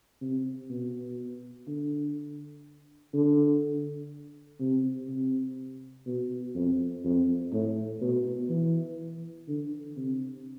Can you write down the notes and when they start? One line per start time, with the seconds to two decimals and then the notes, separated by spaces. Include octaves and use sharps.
0.21 C3
0.70 B2
1.67 D3
3.14 D3
4.60 C3
5.09 C3
6.07 B2
6.55 F2
7.04 F2
7.52 A2
8.01 B2
8.50 E3
9.48 D3
9.97 C3